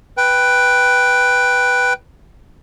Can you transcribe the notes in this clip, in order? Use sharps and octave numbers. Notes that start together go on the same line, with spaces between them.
B4 G5